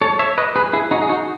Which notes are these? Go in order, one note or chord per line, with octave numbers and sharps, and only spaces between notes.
A4 C#5
C#5 E5
B4 D#5
G#4 B4
E4 G#4
D#4 F#4
G#4
D#4 F#4